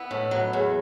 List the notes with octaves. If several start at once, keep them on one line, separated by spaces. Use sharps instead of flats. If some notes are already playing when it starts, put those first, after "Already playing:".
Already playing: B3 E4
A2
F#3
E2